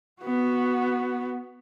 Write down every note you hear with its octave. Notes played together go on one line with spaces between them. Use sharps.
B3 F#4